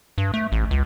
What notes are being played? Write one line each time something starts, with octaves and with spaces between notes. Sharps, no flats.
G2
A3
A1
C#2